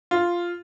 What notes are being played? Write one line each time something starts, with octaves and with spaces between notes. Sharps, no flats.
F4